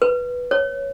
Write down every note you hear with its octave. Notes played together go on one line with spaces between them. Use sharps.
B4
C#5